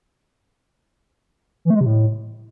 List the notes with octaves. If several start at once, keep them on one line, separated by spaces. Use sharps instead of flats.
E3
A3
G#3
C3
A2